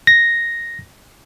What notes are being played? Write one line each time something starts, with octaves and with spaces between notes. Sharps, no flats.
A#6